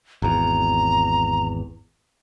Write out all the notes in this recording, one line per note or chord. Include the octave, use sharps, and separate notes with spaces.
G#1 E2 A#5